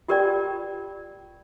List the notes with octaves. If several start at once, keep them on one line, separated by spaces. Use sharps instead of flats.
F4 G4 A#4 B4 D5 G5